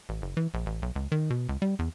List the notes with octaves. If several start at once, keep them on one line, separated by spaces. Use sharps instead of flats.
A1
F#1
E3
A#1
A1
B1
C#2
D#3
B2
C#2
G3
E2